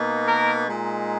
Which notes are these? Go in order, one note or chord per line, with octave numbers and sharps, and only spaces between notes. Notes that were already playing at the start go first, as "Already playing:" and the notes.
Already playing: B2 A#3 D#4
A#4
A#2 G#3 D#4